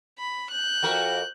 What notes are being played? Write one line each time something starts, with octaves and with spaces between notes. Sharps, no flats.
B5
F#6 G6
F2 F#4 A#4